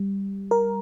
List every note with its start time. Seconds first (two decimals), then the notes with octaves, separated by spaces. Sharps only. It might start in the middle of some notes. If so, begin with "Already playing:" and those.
Already playing: G3
0.51 A#4